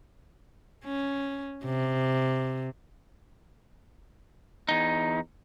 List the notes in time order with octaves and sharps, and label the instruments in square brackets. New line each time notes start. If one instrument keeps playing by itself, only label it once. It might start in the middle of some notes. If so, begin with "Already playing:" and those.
[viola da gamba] C#4
C3
[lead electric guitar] E2 D#4